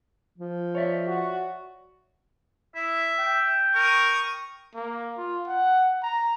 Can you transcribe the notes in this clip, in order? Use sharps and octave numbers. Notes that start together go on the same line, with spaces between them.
F3
C#5 D5 E5
F#4
E4 E5
G5
A#4 C#6 D#6
A#3
F4
F#5
A#5